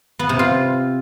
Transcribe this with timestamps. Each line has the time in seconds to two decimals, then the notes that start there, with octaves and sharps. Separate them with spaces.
0.19 B3
0.29 C3
0.39 F4